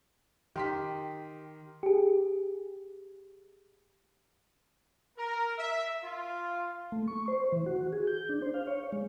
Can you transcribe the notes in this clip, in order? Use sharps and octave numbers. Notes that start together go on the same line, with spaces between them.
D#3 G4 C6 B6
G4 G#4
A#4
E5
F4
A3
C#6
C5
E3
F#4
G#4
G6
D4
C5
F5
C#5
G#3